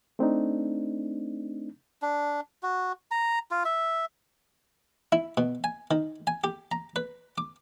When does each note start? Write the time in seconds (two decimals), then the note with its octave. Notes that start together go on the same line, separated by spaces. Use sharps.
0.19 A3 C4 D4 D#4
2.02 D4
2.63 F#4
3.11 A#5
3.51 F4
3.65 E5
5.12 E4
5.37 B2
5.64 G#5
5.91 D#3
6.27 G#5
6.44 G4
6.72 A#5
6.96 B4
7.38 D6